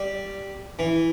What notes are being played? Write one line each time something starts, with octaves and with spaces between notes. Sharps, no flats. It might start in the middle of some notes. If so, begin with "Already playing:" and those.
Already playing: G3
E3